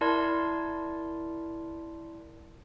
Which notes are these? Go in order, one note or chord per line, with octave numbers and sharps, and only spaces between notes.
E4 A#4 D5 A5 C6 G#6